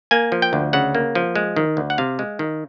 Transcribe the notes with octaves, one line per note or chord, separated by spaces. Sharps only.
A#3 G#5
F3
G5
D2
C#3 F#5
A#3
F3
G#3
D#3
D2
F#5
C3 F5
G#3
D#3